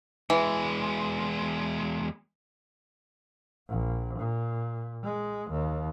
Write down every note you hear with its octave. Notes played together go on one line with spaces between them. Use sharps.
E2 E3 G#3
A#1
A#2
G#3
D#2